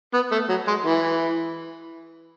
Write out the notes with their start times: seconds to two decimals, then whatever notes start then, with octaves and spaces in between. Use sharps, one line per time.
0.13 B3
0.32 A3
0.49 F#3
0.67 G#3
0.86 E3